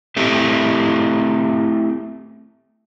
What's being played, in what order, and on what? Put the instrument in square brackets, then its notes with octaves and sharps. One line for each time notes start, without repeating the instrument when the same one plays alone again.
[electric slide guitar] A3 C4 E4 G4 A4